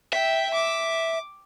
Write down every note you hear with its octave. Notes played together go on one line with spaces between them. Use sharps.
E5 G5
D6